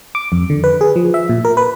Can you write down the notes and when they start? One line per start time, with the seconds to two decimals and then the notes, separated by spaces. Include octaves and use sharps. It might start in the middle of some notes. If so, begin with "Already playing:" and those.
0.15 D6
0.32 F2
0.50 D3
0.64 B4
0.81 G#4
0.96 F3
1.14 E5
1.29 A#2
1.45 A#4
1.57 B4